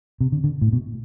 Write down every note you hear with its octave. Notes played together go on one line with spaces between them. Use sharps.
C3
D3
D3
A2
B2